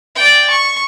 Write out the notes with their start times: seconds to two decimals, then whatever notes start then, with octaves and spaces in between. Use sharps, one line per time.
0.15 D5 G5
0.50 C#6